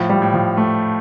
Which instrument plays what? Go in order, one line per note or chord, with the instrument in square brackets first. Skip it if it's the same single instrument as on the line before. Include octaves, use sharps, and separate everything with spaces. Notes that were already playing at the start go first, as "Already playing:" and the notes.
Already playing: [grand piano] A2 [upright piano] F3
[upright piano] G3
[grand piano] A2
[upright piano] F3
[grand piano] A3